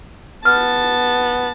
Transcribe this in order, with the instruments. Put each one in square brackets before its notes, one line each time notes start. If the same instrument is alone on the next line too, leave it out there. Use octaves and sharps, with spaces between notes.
[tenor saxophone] B3 [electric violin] A5 A6 [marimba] F6